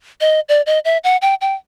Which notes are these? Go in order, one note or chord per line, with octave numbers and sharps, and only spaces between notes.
D#5
D5
D#5
E5
F#5
G5
G5